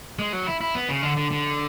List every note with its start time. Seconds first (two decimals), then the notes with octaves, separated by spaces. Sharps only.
0.19 G#3
0.33 F#3
0.47 E4
0.61 E4
0.75 B3
0.89 C#3
1.03 D3
1.17 D3
1.31 D3